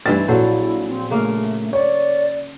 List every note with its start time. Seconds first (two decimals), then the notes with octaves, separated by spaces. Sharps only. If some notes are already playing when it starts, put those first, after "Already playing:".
0.06 G2 E3 C4 D#4 A6
0.28 A#1 F#3 E4 A4 C5
0.88 C4
1.11 C#3 A3 A#3
1.73 C#5 D5